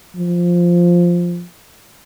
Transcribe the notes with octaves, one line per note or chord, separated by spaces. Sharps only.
F3